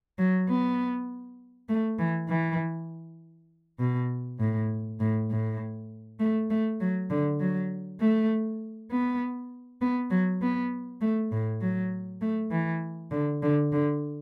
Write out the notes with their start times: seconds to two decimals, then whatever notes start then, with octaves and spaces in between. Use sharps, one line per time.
0.18 F#3
0.49 B3
1.69 A3
1.99 E3
2.29 E3
3.80 B2
4.40 A2
5.00 A2
5.30 A2
6.20 A3
6.50 A3
6.81 F#3
7.10 D3
7.40 F#3
8.00 A3
8.91 B3
9.81 B3
10.11 F#3
10.42 B3
11.01 A3
11.32 A2
11.61 F#3
12.21 A3
12.51 E3
13.11 D3
13.43 D3
13.72 D3